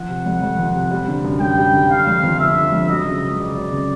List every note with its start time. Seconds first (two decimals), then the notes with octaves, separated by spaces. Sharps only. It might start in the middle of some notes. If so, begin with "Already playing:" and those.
Already playing: F3 F#5
0.09 C3
0.26 F2
0.42 F2
0.58 F3
0.74 C3
0.91 G3
1.08 D3
1.24 F#2
1.41 F#2 G5
1.57 G3
1.73 D3
1.90 D3 F5
2.07 F2
2.23 F3
2.40 G1 E5
2.56 D3
2.72 F2
2.89 F#3 D#5
3.06 C#3
3.22 C#2
3.39 C#2 D5
3.55 F#3
3.72 C#3